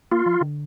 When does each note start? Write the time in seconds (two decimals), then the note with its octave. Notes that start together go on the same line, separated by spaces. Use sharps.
0.12 A#3 F4
0.26 F3
0.41 D3